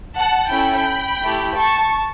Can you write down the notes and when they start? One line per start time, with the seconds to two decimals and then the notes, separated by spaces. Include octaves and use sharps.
0.15 F#5 A5
0.51 C#4 E4 A4 G5 B5
1.22 A3 E4 G4
1.57 A5 C#6